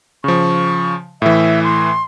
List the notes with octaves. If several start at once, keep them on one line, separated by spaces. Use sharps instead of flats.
C#3 F3 C#6
A2 E3 E5
C6